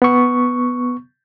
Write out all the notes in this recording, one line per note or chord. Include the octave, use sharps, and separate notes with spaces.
B3 C#6